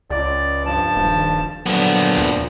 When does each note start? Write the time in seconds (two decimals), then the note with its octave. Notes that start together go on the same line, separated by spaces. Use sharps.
0.10 C#2 D5
0.66 G2 F3 A5
0.96 D#1
1.66 A#2 D3 F3 F#3 B3
2.18 D2